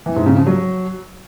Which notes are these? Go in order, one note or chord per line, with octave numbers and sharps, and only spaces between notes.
E3
G#2
C#3
F3
F#3